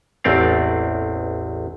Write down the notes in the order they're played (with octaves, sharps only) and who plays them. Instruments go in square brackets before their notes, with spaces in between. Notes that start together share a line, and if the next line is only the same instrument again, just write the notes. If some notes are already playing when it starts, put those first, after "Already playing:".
[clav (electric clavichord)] A1 E2 A3 C4 D5 F5